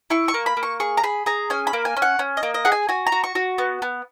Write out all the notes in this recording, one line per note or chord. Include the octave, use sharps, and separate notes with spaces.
E4 C#6
C#6
A#3
B5
A#3
C#6
G#4 C#6
A#5
G#4 B5
G#4 A#5
C#4 G#5
B5
A#3
G#5
C#4
F#5
C#4
D#5
A#3
D#5
G#4 F#5
G#5
F#4 G#5
A#5
F#4
C#6
F#4
B3
B3